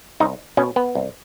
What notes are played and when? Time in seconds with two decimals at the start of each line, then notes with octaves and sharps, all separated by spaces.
0.20 C2 D#4
0.57 B2 C#4
0.76 B3
0.95 C2